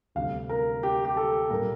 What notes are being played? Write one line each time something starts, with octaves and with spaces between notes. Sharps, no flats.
D2 C3 G3 F5
A#4
G4
G4
A4
A#2 G3 A#3 A#4